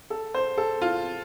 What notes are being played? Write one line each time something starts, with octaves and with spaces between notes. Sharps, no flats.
A4
C5
A4
F4